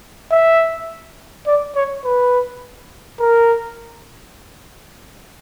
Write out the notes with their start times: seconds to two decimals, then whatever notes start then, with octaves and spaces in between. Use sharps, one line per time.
0.32 E5
1.47 D5
1.76 C#5
2.05 B4
3.20 A#4